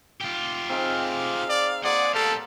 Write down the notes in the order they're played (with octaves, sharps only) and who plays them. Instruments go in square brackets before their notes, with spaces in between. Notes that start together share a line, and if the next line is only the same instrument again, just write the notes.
[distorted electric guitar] F4 G4
[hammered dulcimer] C4 D#4 G#4 [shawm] F5
[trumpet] D5
[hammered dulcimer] A#3 F#4 C6 [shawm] G#4 [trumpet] D5 [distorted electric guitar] F#5
[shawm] G4 [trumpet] A4 [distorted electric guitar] D5 F5